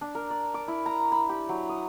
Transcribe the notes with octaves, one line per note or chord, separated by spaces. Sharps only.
D4
A#4
D5
D6
E4
A#5
B5
G4
F#3
D#6